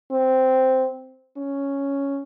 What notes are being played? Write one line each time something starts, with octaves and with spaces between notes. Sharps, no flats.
C4
C#4